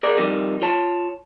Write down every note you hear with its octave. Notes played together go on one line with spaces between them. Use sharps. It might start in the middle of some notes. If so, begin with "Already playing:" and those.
G#4 A#4 D5
F2 D#3 G3
F4 C#5 A5